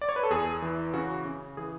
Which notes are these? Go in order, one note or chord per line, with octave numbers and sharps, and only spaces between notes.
D5
C#5
B4
A4
E2 G#4
E3
C#3 F#4
C#3
E3 G#4